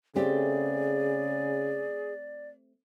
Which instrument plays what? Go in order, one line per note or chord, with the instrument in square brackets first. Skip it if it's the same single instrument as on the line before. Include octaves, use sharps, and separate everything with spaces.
[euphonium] C#3 [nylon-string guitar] A3 C4 G4 [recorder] G#4 [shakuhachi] D5